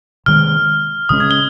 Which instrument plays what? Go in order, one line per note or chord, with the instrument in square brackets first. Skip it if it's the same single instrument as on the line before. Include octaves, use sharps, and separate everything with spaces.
[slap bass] C3 D#3 G#3 [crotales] F6
[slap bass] C#3 G#3 C#4 [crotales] D#6
[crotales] G#6
G7